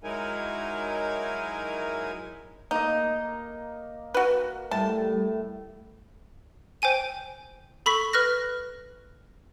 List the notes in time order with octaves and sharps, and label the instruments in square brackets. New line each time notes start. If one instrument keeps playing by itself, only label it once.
[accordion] F#3 G#3 D#4 E4 A#4 G#5
[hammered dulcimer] A#3 D#5 [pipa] D#4
[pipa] F#4 B4
[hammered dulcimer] A2 [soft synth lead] G3 [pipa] A5
[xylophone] C5 G5 G#5 D#7
A4 B5 C#6 B6
B4 F6 F#6 A#6